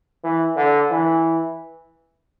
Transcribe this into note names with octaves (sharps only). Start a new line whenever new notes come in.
E3
D3
E3